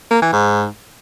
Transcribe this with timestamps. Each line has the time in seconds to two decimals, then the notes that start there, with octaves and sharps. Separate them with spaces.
0.11 A#3
0.22 E3
0.33 G#2